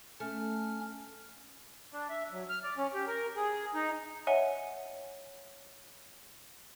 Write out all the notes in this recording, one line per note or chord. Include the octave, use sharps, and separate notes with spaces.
A3 C#4 F6
D4
E5
F#3
F6
D5
C#4
G4
A#4
G#4
D#4
C#5 D#5 E5 F#5 G#5